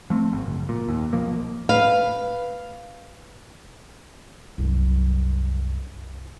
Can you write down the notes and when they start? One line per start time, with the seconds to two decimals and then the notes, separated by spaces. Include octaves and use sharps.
0.10 F3 A3 C4
0.32 G#1
0.46 F#1
0.69 A#2
0.89 D#2
1.13 B1 F3 A#3
1.69 B4 F5
4.58 C2 F#2